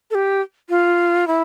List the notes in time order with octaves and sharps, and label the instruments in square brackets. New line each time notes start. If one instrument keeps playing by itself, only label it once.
[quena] A4
G4
F4
E4